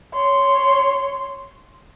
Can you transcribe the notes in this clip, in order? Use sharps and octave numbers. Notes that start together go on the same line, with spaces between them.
C#5 C6